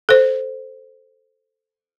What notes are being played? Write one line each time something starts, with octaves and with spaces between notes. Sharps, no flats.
A4 C5